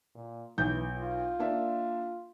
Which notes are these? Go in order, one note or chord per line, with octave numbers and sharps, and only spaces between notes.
A#2
B1 E3 G6
F4
A#3 D4 E5